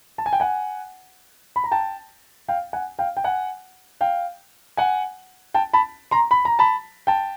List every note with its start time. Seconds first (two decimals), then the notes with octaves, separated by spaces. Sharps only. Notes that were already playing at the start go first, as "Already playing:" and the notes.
0.18 A5
0.26 G#5
0.33 G5
0.40 F#5 G#5
1.56 B5
1.64 A#5
1.72 G5 A5
2.48 F5 G5
2.73 F#5 G#5
2.99 F5 G5
3.17 G5
3.24 F#5 G#5
4.01 F5 G5
4.77 F#5 G#5
5.54 G5 A5
5.73 A5 B5
6.11 A#5 C6
6.31 B5
6.45 A#5
6.59 A5 B5
7.07 G5 A5